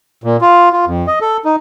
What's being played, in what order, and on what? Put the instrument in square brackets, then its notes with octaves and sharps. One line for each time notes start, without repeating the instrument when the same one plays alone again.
[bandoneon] A#2
F4
F4
F2
D#5
A4
D#4